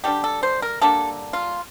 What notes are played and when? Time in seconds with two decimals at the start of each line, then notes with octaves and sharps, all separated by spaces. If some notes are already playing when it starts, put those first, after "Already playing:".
0.04 D3 G3 A#3 D4 G4
0.24 A4
0.43 C5
0.62 A#4
0.81 D3 G3 A#3 D4 A4
1.33 F4